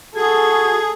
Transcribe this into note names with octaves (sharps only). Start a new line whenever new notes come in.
F#4 G#4 A4 G#6